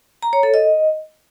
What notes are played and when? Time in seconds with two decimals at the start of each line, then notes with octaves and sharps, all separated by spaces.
0.23 A#5
0.33 C#5
0.43 A4
0.54 D#5